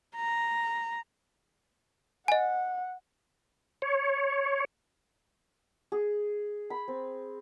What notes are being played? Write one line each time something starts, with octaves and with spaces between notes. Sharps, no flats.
A#5
D#5 F#5 G#5
C#5
G#4
B5
C4